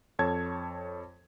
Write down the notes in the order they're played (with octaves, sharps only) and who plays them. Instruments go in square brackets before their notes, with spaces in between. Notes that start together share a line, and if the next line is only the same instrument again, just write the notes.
[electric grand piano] F2 A4 C#5 A5 G#6